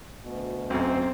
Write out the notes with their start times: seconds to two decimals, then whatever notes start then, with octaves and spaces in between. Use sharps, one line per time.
0.20 D2 B2
0.70 B1 F#2 C4